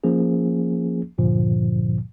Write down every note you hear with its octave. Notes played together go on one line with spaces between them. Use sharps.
F3 A#3 C#4 G#4
D2 G2 A#2 D3 F3